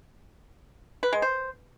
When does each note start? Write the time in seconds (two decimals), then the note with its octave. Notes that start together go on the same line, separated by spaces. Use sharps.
1.03 B4
1.13 G#3
1.22 C5